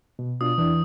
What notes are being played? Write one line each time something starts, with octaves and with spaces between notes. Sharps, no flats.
B2
B2 D4 F4 D#6
E2 E3 D4 E4